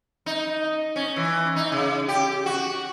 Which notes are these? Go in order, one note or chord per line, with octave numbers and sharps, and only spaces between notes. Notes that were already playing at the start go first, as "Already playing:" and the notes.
D#4
C#4
E3
D#4
C#3
G4
F#4